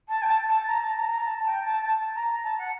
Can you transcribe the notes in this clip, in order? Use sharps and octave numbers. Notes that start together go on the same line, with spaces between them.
A5
G5
A5
A5
A#5
A5
A#5
A#5
A5
G5
A5
A5
A#5
A5
F#5